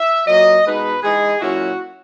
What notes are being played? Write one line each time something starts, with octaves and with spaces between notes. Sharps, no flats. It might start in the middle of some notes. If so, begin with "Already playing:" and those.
Already playing: E5
A#2 F#3 A#3 D#5
B2 G#3 B3 D#4 B4
E3 G#3 D#4 G#4
A#2 F#3 C#4 E4 F#4